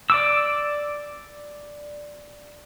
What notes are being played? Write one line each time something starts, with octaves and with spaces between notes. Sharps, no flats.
D5 D6 E6